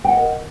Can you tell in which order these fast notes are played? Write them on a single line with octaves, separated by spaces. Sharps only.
G5 F#5 D#5 A#4